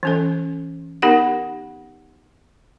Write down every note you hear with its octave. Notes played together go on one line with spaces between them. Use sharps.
E3 C#4 A4
B3 D#4 G4 A#4 F#5